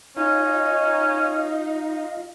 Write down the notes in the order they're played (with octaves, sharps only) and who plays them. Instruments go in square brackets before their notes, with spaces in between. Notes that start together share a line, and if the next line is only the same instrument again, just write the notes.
[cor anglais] C#4 [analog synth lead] D#4 [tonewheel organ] F4 D#5 F5